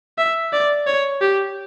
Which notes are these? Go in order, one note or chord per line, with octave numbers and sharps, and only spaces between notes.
E5
D5
C#5
G4